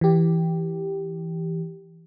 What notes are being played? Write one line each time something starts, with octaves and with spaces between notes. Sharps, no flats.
E3 G4